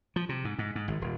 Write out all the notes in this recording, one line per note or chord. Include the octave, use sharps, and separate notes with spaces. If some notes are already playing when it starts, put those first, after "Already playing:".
F3
C3
G#2
G#2
G#2
G#1
D#1